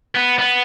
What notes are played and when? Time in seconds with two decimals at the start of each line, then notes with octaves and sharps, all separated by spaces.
0.15 B3
0.39 B3